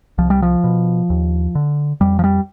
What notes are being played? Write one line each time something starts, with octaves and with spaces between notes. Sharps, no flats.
C2 F3
G3
F3
B2
D#2
D3
F2 G3
F3
G3